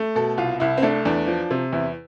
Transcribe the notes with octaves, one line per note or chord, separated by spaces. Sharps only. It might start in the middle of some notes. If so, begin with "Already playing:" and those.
Already playing: A3
B2 A4
C2 F4
C2 E4
C4
A3 D4
E2 D4
F3
C3
E2 E4